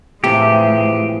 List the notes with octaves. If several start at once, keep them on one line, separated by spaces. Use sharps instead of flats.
A2 C3 E3 F3 G#3 G4 A4